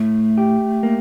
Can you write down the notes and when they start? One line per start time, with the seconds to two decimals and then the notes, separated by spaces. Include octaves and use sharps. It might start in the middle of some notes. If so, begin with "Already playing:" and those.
Already playing: A2 A3
0.38 G4
0.83 A#3